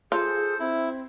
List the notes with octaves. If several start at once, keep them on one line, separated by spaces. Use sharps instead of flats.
F4 G#4 A4 C5
C4 E4